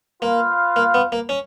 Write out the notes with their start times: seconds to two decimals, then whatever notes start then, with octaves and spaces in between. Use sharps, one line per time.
0.22 A#3 F4 B4 F5
0.76 A#3
0.94 B3
1.12 A#3
1.29 C#4